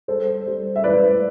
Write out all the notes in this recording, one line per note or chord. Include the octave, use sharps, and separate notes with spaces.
G3 A4 C5
G3
E5
E3 B4 D5